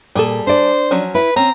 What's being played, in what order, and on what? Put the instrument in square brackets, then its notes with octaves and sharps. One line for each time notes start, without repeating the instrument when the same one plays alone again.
[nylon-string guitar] A#2 [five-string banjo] G3 G#4 A4
[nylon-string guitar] D4 D5 [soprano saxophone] C5
[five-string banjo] F3 F#3 C#4
[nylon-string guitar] E4 [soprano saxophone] B4
[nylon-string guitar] C4 [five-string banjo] C#4 [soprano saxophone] A#5